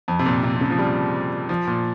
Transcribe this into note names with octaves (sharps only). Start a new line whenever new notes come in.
F2
C3
A#2
C3
C3
C#3
F3
G3
F3
A#2